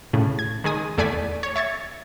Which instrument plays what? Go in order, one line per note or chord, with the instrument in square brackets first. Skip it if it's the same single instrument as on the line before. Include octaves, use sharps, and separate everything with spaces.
[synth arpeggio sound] A2 C#3
G#6
D#3 G#3 G#5 D#6
E2 A3 D5 G#5 B6
C#5
E5 C#6 G#6 A6